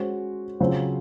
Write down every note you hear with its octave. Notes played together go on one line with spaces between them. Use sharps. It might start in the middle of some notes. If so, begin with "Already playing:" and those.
Already playing: G#3 C#4 F#4 C5
C#3 F#3 C4 F4 C5